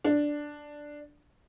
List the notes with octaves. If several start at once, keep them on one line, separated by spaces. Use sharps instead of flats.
D4